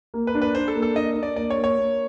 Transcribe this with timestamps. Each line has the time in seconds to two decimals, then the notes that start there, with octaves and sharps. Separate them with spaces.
0.14 A#3
0.27 B4
0.35 D4
0.42 B4
0.55 D4 C5
0.68 A4
0.75 A#3
0.82 A4
0.96 D4 D#5
1.16 D4
1.23 D5
1.36 A#3 D5
1.50 C#5
1.57 A#3
1.64 C#5
1.78 A#3